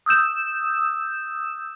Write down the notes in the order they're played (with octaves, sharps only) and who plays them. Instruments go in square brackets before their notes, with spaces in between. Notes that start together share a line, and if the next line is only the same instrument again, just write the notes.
[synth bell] D#6 E6 G6 E7